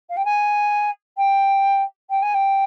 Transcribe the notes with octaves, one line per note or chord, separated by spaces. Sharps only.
F5
G5
G#5
G5
G5
G#5
G5